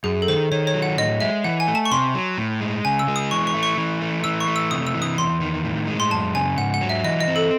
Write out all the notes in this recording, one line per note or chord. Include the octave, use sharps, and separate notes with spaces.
F#2 G#4
A4
D#3 C5
D#3 C#5
C#5
F#3
F#5
A2 D#5
G#3 E5
E3 F#5
G#5
A3
A5
C#6
C3 C6
F#3
A2
G#3
C#3 G#5
E6
G#3
D#6
E3 C#6
C#6
A3
C#6
E3
A3
E3 E6
C#6
A3
E6
C3 D#6
E6
E3
D#6
E2 C6
D#3
A2
G#3
C6
F#2 A5
C#3 G#5
G#2 F#5
F#5
F#3
E5
E3 D#5
D#5
C4
A4